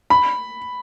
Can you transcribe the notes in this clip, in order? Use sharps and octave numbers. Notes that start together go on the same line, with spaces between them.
B5